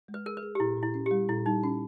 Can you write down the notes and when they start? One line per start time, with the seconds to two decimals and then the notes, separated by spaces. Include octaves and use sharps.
0.08 G#3
0.14 B4
0.26 G#4 A#4
0.37 B4
0.43 G#4
0.55 G4
0.60 A#2 E4
0.77 A#2
0.83 E4
0.94 C#4
1.06 G3 G4
1.29 A#2 E4
1.46 G3 D#4
1.63 C#4